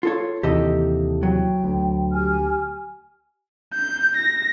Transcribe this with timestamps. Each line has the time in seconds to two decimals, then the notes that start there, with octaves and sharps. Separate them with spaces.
0.03 F4 A4 C#5
0.43 D#2 C3 E3 G4 A4 D#5
1.23 F#3 G5
1.64 D2
2.13 G4 G#5 F6
3.74 G6
4.17 A#6